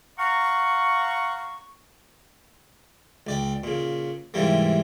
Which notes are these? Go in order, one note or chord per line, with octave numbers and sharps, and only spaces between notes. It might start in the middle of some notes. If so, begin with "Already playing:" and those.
F5 F#5 A#5 C#6
C#2 D5 G5
A#2 C#3
G#2 C3 E3 G3 A#3